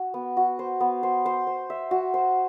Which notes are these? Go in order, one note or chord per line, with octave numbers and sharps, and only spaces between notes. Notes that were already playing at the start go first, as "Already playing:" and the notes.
Already playing: F#4
B3
F#4
C5
B3
C5
C5
C5
E5
F#4
C5